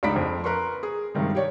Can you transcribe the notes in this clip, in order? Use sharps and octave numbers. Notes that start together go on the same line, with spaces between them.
C#2 D4 D#4 B5 B6 D7
F2
A#4 B4 C6 C#6
G#4
G2 C3 D#3 G#3
G4 C#5 D5